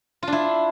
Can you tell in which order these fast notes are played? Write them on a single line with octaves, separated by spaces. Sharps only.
F4 D4 E4